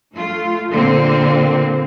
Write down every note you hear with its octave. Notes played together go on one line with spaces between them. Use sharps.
A3 F4
A#2 D3 A#3 C4